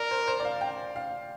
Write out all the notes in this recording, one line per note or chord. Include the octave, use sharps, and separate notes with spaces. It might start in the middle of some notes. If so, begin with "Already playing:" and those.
Already playing: A#4 D5
C5
C5
D5
F5
G5
F5